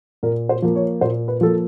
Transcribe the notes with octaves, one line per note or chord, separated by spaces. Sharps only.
A#2 A#4
C5
F3 A#3
C#5
A#2 C5
B4
F3 A#3 A4